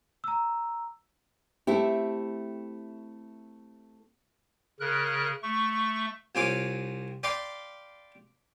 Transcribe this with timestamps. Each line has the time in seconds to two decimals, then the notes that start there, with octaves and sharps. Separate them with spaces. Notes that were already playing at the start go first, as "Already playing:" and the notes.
0.24 A#5 E6
1.67 A3 C4 E4 G4
4.80 C#3 A#4 F#6
5.43 A3 C#6
6.35 C2 C4 F4 C#5 G#5 D6
7.23 D5 F5 G5 B5 C6 D6